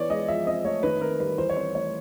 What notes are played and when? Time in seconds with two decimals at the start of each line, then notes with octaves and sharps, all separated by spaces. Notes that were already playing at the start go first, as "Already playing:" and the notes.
Already playing: E3 B3 C#5 D5
0.10 G#3 D#5
0.28 F3 E5
0.46 C4 D#5
0.65 A3 C#5
0.83 D#3 B4
1.01 C4 A#4
1.20 G3 B4
1.38 E3 C5
1.49 C#5
1.56 C4 C5
1.75 A3 C#5